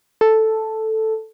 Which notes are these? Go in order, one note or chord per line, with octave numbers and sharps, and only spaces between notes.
A4